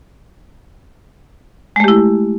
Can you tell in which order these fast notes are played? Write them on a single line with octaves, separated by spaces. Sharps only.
G#3 A3 G4 E4